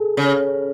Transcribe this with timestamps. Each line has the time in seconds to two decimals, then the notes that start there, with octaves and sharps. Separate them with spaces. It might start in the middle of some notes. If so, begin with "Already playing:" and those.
Already playing: G#4 A4
0.17 C#3